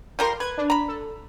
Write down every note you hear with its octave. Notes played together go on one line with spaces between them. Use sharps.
F3 G3 A#4 C6 G6
B4 G#6
D4
A#5 B5
A4